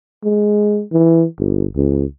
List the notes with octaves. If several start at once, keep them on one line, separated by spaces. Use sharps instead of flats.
G#3
E3
G1
C#2